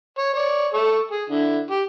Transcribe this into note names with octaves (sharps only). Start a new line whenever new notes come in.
C#5
C#5 D5
A4 C#6
G#4
D3 E4
G4